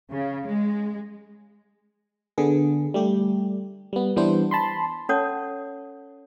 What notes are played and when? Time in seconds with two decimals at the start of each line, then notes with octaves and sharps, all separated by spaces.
0.11 C#3
0.47 G#3
2.38 D3 B3 G#4
2.94 G3 A3 G4
3.93 G3 B3
4.16 E3 G3 B3 D4 E4 C5
4.51 A5 B5 C6
5.09 C#4 A4 C#5 F#5 A5 D#6